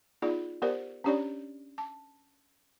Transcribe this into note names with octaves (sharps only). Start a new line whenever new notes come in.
B3 D#4 F4 G#4 D5
B3 G4 A#4 C5 D5
C#4 D4 G4 C#5 D5
A5